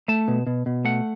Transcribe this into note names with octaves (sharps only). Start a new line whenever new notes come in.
A3 A5
B2
B2
B2
A3 F#5